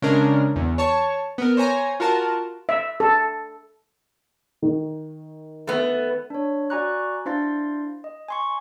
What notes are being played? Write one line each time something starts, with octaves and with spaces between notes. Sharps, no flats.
C#3 G#3 D4 A#4
E2
C#5 A5 C#6
B3 A#4
C5 C#5 G#5 A#5
F4 F#4 A#4 A5
E5
A4
D#3
A3 B3
D4 C#5
F#4 D5 G#5 A#5 C#6 F#6
D4 E4 C5 F5 C6 A6
D#5
G#5 C6 C#6